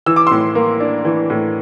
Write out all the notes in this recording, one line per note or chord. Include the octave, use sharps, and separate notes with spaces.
E3 E6
D6
A2 C6 E6
A#3
D4
E3
A2